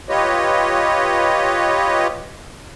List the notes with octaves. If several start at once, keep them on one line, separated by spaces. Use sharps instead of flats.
F4 G4 B4 C#5 D#5